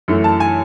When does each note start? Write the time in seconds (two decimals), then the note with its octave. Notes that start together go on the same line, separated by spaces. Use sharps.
0.08 F#2 E3 A3
0.24 A5
0.40 G#5